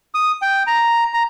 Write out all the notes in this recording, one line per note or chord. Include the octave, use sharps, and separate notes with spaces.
D#6
G5
A#5
A#5